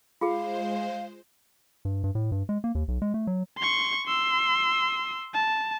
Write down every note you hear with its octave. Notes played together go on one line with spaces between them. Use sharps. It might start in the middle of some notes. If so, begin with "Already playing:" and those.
G#3 F4 G#4 C5 F5
G2
G2
A2
G2
G#3
A#3
D#2
B1
G#3
A3
F#3
C6 C#6
C6 E6
A5